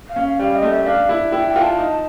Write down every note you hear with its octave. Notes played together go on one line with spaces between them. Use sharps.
F5
C#4
F5
G3 F5
D#5
A3
E5
D4 F5
E4
E4 G5
G5
F4
A5
D#4